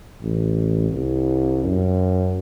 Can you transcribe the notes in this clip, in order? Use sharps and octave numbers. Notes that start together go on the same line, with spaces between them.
A1
C2
F#2